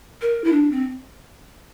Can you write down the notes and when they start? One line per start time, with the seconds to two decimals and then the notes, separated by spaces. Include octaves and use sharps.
0.22 A#4
0.44 E4
0.52 D4
0.71 C4